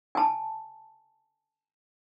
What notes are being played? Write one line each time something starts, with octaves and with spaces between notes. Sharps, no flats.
G#5 A5